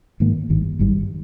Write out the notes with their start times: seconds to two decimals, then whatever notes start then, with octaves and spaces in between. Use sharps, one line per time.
0.20 G#2 D#3 A#3
0.49 G#1 G2 D#3 G3
0.79 G#1 G2 D#3 G3